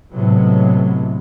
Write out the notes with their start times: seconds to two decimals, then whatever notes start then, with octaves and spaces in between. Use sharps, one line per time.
0.12 A2 C3 F#3 G#3 B3